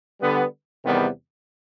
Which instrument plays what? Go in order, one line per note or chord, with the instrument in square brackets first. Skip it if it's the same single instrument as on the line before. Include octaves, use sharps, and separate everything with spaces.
[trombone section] D3 G3 B3
E2 C3 D#3 G3 B3